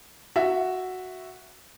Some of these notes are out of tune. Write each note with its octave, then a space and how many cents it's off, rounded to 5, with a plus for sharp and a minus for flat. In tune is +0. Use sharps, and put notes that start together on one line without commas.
F#4 +0 E5 +0